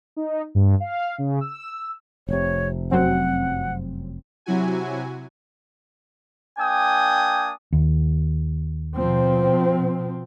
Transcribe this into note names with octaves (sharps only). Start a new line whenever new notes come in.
D#4
G2
F5
C#3
E6
F1 C3 C#5
F#2 F#3 C4 F#5
C3 F#3 E4 F#4 G#5
A#3 D4 G5 G#5 D#6
D#2
B2 F3 C4